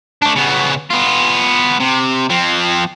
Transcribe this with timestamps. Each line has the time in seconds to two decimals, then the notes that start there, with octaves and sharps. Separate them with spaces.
0.22 A3 D4
0.36 C#3 B3
0.91 B3 F4
1.80 C3
2.30 F3 C4